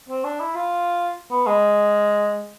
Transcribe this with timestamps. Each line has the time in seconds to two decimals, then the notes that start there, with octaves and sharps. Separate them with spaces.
0.09 C4
0.24 D4
0.40 E4
0.55 F4
1.31 B3
1.46 G#3